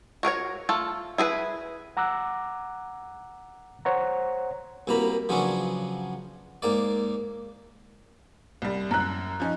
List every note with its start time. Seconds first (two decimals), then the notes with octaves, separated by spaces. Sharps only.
0.23 F#4 A#4 B4 C#5
0.69 A3 F4 A4
1.18 E4 G#4 A#4 B4
1.97 F#5 A#5 D6 E6 F#6
3.85 C5 C#5 F#5 A#5
4.87 C2 B2 A#3 A#5 B5
5.29 C#3 F3 F#3 B3 C#4 D4
6.62 G#2 A#3 D5
8.62 C2 G3
8.91 F#2 A#5 F#6
9.40 F3 C#4 D#4